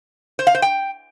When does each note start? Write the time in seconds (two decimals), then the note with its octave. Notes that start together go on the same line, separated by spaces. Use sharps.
0.39 C5
0.47 F5
0.55 C5
0.62 G5